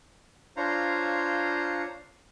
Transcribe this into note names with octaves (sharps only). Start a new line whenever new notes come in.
D4 F4 C5 C#5 F5 A#5